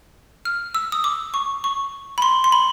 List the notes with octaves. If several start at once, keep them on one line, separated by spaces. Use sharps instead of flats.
F6
E6
D#6
D6
C#6
C#6
B5
C6
C6
B5